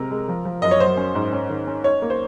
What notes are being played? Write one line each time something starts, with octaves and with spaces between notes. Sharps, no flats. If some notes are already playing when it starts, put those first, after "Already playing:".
Already playing: C3 G#3 A#4
G#3
F3
F3
F#2 D#5
C#5
F#3 C5
C#4
G#2
C#4
D#3
C#4
D#4 C#5
A#3
C5